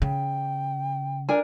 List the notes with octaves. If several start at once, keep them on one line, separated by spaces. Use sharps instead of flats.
C#3 G5
D4 A#4 G#5